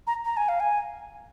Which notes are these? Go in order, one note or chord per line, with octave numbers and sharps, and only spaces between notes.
A#5
A#5
G#5
F5
G#5